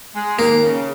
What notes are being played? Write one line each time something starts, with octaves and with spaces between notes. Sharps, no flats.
G#3
D#2 A#3
C#3